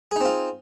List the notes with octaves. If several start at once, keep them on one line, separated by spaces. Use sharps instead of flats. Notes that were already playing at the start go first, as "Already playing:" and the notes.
C4 D#4 F4 G#4